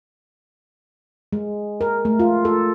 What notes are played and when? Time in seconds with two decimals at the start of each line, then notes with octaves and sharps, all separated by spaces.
1.33 G#3
1.81 A#4
2.05 A3
2.20 F4
2.45 A4